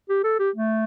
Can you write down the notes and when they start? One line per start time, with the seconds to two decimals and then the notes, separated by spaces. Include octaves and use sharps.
0.09 G4
0.24 A4
0.39 G4
0.56 A3